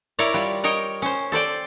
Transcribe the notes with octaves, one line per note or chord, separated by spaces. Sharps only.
E4 A#4 C#5 D5
G3 F4
A#4 C#5 D#5 G5
C#4 C5
A4 C5 D5 G5